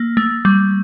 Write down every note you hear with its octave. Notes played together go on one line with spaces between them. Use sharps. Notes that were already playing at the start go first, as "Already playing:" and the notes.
Already playing: A#3
A3
G3